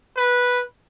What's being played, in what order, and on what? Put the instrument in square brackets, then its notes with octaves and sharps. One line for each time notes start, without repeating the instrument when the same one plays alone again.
[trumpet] B4